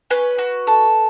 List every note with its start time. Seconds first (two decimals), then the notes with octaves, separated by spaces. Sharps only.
0.10 C#4 B4
0.38 F#4
0.67 A4